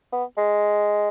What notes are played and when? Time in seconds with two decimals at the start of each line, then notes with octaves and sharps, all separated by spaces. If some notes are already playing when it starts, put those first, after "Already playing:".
0.12 B3
0.37 G#3